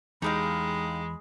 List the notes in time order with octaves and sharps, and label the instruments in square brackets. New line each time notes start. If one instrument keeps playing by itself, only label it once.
[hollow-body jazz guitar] E2 [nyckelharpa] G#3 [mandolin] D#4 G4 F5 [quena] B5